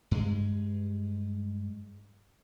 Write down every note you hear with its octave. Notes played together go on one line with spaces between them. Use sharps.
G2 G#3